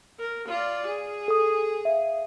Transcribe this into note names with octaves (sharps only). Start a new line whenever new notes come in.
A#4
F4 D5
G#4
A4 D#6
E5 F5